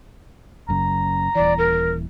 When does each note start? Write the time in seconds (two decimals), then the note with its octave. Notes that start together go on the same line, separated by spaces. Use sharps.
0.68 F#1 F#2 C#3 A#5
1.35 D#1 E3 D5
1.58 A#4